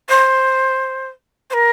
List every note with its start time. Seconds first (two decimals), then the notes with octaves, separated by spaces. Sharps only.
0.09 C5
1.50 C5
1.53 A#4